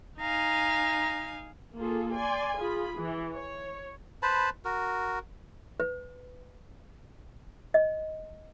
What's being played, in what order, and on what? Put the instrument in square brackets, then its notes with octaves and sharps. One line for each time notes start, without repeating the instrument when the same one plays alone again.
[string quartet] D#4 F5 G#5 [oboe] A#5
[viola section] A#3 F4 G#4 A4
D5 G#5 C6
F4 G#4 B5
E3
C#5
[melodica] B4 C5 A5 B5
F#4 A#4
[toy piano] B4
D#5